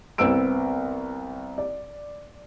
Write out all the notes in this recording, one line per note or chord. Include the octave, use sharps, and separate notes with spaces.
C2 B3 C4 E6 D7
D5